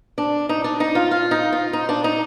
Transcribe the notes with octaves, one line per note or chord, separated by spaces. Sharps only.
D4
D#4
D4
D#4
F4
F4
D#4
F4
D#4
D4
D#4